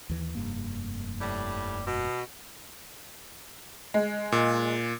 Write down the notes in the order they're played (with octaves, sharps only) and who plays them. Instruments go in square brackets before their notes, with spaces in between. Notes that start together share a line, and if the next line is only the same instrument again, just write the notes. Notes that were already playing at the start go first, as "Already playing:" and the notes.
[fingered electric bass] D#2 E3
F1 G2 A#3
[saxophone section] A2 G3
B2
[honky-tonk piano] G#3
[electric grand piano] A#2